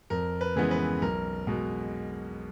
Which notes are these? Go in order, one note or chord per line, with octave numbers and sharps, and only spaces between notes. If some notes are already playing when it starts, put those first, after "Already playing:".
F2 A#4
B4
C#3 E3 G#3 B3
B4
B1 A#4
B2 G#3